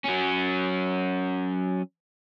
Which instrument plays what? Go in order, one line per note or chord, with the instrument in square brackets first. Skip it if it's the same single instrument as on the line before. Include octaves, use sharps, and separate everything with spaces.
[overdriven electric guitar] F#3 C#4